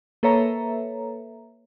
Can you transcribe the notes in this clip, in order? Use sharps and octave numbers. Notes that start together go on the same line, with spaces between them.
A#3 A4 B4 C#5 E5 A#5